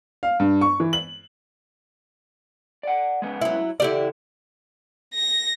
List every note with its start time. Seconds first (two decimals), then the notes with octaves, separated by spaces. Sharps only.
0.23 F5
0.40 G2
0.61 C#6
0.80 E3
0.93 F#7
2.83 D5 F#5
3.22 G#3 B3 C#4
3.41 F#3 E4
3.80 C#3 E4 G4 A4 D5
5.14 A#6